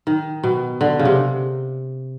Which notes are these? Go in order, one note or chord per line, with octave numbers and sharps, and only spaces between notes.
D#3
B2
D3
C#3
C3